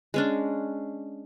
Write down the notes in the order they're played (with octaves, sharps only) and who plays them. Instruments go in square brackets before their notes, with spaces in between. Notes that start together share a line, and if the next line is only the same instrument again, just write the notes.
[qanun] G#3 C#4 D4